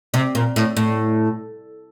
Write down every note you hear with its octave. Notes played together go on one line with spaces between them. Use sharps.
C3
A#2
A2
A2